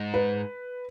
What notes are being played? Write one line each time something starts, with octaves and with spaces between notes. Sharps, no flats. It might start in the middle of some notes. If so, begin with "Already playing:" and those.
Already playing: G#2
B4